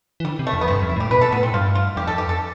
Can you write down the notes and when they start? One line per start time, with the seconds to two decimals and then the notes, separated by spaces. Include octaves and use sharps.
0.20 E3
0.25 D3 G3
0.39 C3
0.47 A3
0.53 F2
0.61 B3
0.68 G2 C4
0.82 F2
0.89 E4
0.96 A2 G4
1.11 B2 B4
1.21 A4
1.32 A2 B3
1.43 C4
1.54 G2 F4
1.75 F4
1.97 F2 G4
2.07 A4
2.18 G4
2.29 A4